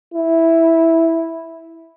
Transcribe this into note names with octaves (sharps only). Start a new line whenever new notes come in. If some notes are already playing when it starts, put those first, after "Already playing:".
E4